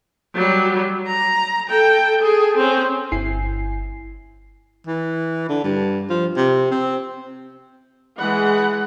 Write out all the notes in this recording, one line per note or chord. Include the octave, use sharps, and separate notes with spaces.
F#3 G3
A#5
A4 G5
G#4 A4
C4 C#4
G1 E4 G#5 C7
E3
D3
G2
F3
C3
C4
E3 G#3 F#5 B5